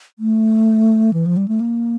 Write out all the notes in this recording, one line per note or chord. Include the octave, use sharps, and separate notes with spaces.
A3
E3
F3
G3
A3
A#3